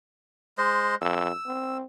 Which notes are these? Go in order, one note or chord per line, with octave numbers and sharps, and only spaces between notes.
G#3 C5 D#5
F2 E6
C4